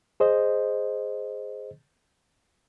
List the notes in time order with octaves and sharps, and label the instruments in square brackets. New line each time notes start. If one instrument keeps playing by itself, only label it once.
[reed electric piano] G#4 C5 D#5